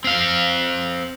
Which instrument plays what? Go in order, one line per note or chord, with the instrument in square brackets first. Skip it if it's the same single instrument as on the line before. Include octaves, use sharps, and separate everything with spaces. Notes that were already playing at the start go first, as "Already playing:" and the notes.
[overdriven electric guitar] C4 F5